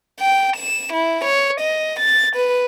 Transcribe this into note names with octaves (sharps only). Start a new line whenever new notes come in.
G5
E7
E4
C#5
D#5
A6
B4